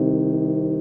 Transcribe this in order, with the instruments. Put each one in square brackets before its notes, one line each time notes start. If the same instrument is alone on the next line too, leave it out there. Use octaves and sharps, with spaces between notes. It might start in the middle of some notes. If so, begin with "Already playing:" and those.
Already playing: [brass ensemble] C2 C3 D#3